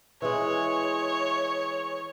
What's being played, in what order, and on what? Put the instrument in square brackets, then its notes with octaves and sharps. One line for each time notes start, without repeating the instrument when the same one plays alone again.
[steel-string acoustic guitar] E3 G#3 [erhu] C#5